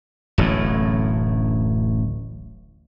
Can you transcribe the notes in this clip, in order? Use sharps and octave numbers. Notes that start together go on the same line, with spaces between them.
D1 A1 F#2 A2